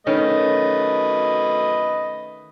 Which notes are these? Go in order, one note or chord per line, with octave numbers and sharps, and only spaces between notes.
D#3 A3 C#4 B4 D#5